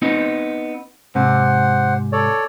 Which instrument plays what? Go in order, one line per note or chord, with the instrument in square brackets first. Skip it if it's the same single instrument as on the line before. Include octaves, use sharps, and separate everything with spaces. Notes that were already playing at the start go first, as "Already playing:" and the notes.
[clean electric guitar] B3 C4 D#4
[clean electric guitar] G#2 C3 [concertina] C5 F#5
[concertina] A4 C#5 D5